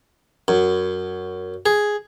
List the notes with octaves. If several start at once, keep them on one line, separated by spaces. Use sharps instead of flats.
F#2
G#4